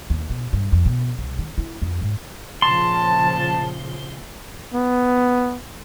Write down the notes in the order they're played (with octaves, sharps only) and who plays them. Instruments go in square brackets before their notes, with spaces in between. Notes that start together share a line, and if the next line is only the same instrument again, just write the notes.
[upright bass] D#2
B2
G2
F2
B2
C2
D#3
E4
F2
G#2
[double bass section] A#2 C#3 F3 [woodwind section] A5 [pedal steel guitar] C6
[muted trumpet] B3